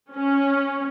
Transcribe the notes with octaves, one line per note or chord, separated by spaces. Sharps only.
C#4